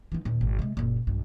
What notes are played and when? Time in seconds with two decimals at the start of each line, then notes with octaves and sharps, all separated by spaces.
0.12 E3 D#4
0.25 D#2 A#2
0.41 G#1
0.59 C3 G#3
0.77 F#1 A#2
1.07 B1 G2